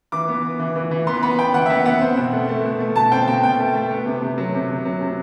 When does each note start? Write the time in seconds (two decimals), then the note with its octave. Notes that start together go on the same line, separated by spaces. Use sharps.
0.12 E3 D6
0.28 B3
0.44 B3
0.60 E3
0.76 E3
0.91 E3
1.07 B3 C6
1.23 B3 B5
1.39 B3 G5
1.54 E3 F#5
1.66 E5
1.70 B3 F#5
1.85 B3 F#5
2.01 C4
2.17 B2
2.33 A3
2.49 A3
2.65 B2
2.80 A3
2.96 B2 A5
3.12 C4 G5
3.28 B2 G5
3.43 B2 G5
3.59 A3
3.75 A3
3.91 B3
4.06 C3
4.22 C3
4.38 F#3
4.54 C3
4.70 C3
4.86 F#3
5.01 C3